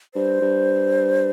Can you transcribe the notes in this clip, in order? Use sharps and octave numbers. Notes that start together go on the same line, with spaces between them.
G2 C5
G2